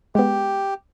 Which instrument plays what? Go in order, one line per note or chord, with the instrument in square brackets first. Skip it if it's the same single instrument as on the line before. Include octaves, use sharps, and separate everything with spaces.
[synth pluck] G#3 B3 [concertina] G4